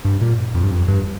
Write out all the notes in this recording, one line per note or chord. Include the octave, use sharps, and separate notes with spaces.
G2
A#2
F2
G2
F2
G2